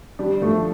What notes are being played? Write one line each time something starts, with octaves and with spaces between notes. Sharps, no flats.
G3 D4
F3 A3